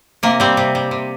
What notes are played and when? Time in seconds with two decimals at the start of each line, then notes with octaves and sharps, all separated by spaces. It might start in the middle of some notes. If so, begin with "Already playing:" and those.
0.23 C3 A#3
0.40 G3 C4
0.57 C3
0.75 G3
0.91 C3